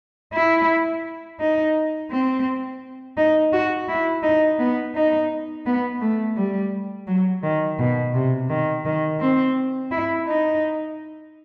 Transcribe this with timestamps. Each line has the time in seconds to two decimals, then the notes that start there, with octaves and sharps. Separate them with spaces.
0.33 E4
1.40 D#4
2.11 C4
3.17 D#4
3.53 F#4
3.88 E4
4.23 D#4
4.59 B3
4.95 D#4
5.66 B3
6.01 A3
6.36 G3
7.07 F#3
7.43 D#3
7.79 B2
8.14 C3
8.50 D#3
8.85 D#3
9.20 C4
9.91 E4
10.27 D#4